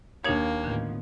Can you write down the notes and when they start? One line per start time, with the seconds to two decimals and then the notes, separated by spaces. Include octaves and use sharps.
0.24 D#2 A#3 D4 D#4 C#5 G#6
0.64 A1 D3 D#3 F3 B3